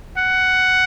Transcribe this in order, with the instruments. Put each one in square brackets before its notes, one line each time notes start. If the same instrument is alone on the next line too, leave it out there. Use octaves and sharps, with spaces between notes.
[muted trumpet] F#5